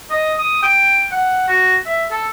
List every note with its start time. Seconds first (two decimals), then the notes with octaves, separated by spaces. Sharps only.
0.10 D#5
0.38 D#6
0.63 G5
1.12 F#5
1.48 F#4
1.86 E5
2.11 A4